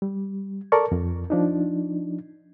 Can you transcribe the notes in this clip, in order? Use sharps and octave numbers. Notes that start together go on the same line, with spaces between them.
G3
A4 A#4 D5 A5 C#6
F2 F3
F3 D4 D#4